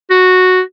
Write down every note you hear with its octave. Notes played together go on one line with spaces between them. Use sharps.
F#4